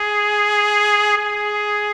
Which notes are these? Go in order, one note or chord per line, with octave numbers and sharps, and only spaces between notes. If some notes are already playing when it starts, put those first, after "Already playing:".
Already playing: G#4
G#4